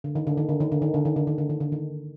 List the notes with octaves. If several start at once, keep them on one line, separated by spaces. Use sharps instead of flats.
D3
D#3
D3
D#3
D3
D#3
D3
D#3
D3
D#3
D3
D#3
D3
D#3
D3
D#3